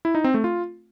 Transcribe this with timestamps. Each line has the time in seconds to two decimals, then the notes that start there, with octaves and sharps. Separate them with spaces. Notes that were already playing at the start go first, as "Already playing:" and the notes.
0.05 E4
0.15 D#4
0.24 C4
0.34 A3
0.44 F4